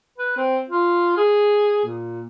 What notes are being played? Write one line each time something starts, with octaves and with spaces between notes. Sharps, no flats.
B4
C4
F4
G#4
A#2